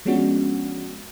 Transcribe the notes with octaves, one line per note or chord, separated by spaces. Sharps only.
F3 G#3 B3 C#4 D4 F#4